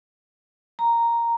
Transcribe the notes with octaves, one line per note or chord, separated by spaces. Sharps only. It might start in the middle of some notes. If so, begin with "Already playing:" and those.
A#5